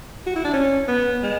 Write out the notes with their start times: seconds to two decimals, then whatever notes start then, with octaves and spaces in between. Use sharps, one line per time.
0.27 F#4
0.35 E4
0.45 D4
0.54 C#4
0.88 B3
1.23 G#3